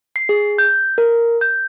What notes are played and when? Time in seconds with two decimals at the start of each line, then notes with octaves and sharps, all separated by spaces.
0.16 C7
0.29 G#4
0.58 G6
0.98 A#4
1.41 G6